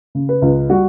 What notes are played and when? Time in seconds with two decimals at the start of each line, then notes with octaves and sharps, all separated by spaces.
0.15 C#3
0.29 B4
0.42 C#2
0.70 G3 F#4